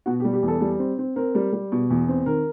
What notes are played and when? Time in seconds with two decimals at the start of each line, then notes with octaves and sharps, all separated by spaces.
0.06 B2 F#4
0.20 G4
0.24 G3
0.33 G4
0.43 E2
0.48 A4
0.61 G3
0.79 C4
0.98 C4
1.16 C4 A#4
1.35 G3
1.53 G3
1.72 B2
1.90 E2
2.08 C4
2.26 D#3 A#4